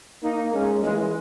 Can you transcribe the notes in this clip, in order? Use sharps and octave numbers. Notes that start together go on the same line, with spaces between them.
A#3 D#4
G#3 C#4
E3 G#3